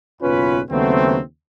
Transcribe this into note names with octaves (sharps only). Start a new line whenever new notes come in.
F#1 B1 E2 C#4 F4 B4
D#2 C#3 F#3 A3 B3 C4